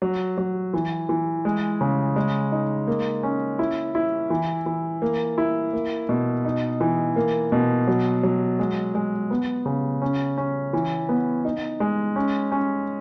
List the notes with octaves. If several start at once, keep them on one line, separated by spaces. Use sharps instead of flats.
F#3
F#3
E3
E3
G#3
C#3
G#3
D#4
A#3
C#4
E4
E4
E3
E3
A#3
E4
A#3
B2
D#4
E3
A#3
B2
F#3
F#3
G#3
G#3
B3
C#3
C#4
C#4
E3
B3
D#4
G#3
C#4
C#4